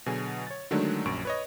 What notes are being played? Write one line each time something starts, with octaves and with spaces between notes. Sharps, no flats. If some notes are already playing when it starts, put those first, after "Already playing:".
B2 D3 F#3 G#4 G#5
C#5 A6
D3 D#3 F#3 G#3 A3 D4
A#1 F#2 C#6 D7
B4 C#5 D#5